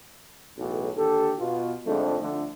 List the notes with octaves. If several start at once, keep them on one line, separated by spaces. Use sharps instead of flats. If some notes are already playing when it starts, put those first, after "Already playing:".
B1 E2 A2
D#2 D3 G4 A4
B2 F4
F2 G#2 D3 F3 G#3 A3
F2 D3 A3